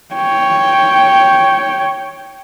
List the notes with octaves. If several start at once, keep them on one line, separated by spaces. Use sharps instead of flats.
C#5 G5